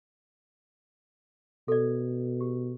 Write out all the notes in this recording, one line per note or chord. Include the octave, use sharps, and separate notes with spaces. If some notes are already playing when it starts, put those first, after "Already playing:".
B2 A4 D5
G4